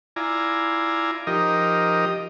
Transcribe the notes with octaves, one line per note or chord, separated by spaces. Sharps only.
E4 F4 D5 G#5 A#5
F3 D#4 G4 A#4 D#5